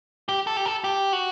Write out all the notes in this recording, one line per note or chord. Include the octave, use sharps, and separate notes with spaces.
G4
A4
G4
A4
G4
F#4